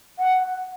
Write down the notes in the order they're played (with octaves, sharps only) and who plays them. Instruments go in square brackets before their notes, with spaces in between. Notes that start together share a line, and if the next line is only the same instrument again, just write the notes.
[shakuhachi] F#5